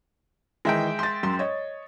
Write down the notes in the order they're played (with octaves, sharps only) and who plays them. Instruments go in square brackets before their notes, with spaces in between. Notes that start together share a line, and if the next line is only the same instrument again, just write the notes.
[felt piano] D#3 E3 [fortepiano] G#3 E5 G5
[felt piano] C6 A6
F#2 C6
C#5 D#5